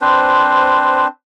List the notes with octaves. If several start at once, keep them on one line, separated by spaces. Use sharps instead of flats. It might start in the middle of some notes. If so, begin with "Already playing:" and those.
C4 D4 B4 C5